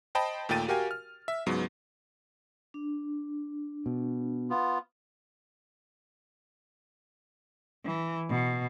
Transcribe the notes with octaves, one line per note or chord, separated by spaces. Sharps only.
C5 D#5 G5 A5 B5
D#2 A#2 A3 G5 A6 D#7
F#4 G4 A#4 F5 G5 G#5
F6
E5
C#2 G#2 F#3 B3
D4
B2
B3 F4
E3
B2